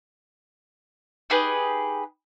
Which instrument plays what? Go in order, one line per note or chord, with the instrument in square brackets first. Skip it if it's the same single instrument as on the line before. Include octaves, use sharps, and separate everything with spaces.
[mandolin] D#4 G4 G#4 B4